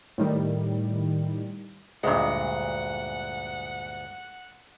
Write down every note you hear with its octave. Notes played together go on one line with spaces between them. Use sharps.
A2 D#3 G3
D2 G2 A#2 G#3 F#5